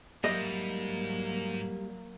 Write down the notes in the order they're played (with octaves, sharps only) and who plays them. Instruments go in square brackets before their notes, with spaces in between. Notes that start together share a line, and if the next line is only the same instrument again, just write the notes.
[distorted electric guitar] G#2 [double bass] F#3 A#3 [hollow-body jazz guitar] G3 E5 [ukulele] D#5